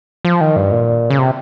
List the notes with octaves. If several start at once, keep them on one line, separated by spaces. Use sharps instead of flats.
F3
D#3
G2
A#2
C#3
C3